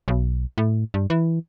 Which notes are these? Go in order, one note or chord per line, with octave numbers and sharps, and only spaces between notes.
B1
A2
G2
E3